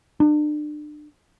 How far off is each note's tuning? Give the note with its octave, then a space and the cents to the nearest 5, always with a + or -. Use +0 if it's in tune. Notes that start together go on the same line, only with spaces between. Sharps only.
D4 +35